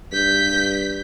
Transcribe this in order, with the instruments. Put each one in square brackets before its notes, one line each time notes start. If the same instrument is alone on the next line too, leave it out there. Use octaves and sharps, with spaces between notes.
[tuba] G2 [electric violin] G6 B6